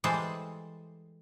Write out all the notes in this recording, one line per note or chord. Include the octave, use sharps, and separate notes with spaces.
E3 G3 G#3 A4 C5